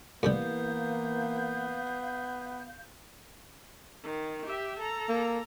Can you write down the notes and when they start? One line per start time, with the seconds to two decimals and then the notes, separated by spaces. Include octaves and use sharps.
0.23 A2 C3 E3 G3 A#3 B3 F5 G6
4.03 D#3
4.46 G4 E5
4.79 A4 A#5
5.09 A#3